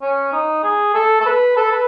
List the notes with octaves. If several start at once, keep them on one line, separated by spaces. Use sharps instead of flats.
C#4
D#4
G#4
A4
A4
B4
A4
B4